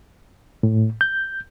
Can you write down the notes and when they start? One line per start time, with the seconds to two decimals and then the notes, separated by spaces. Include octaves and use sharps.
0.63 A2
1.01 G6